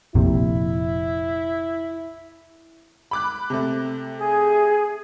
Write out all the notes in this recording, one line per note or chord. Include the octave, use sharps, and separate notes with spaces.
F1 A#1 C3 E4
B5 D6 F#6
C3 A3
G#4